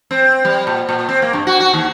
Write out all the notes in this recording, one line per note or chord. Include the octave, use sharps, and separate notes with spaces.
C4
G3
A#2
A#2
C4
A#3
G2
F#4
F#4
D#2